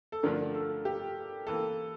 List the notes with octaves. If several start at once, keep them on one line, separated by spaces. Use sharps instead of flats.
A4
G2 D3 F3 A3 D4 A#4
A4
G4
E3 A#3 A4